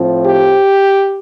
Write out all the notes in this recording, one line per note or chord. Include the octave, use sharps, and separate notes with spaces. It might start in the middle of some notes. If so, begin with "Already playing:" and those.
Already playing: A2 F3 C4
G4